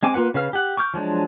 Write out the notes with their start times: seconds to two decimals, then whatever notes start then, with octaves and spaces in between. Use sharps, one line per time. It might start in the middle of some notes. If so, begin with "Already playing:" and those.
0.03 G#3 C4 G#5 D6
0.14 A#3 F4 B4 F#5
0.34 C#3 B4 F5 F6
0.53 G4 F#5
0.77 C#6 D6 F6 G6
0.94 F3 F#3 G#3 D4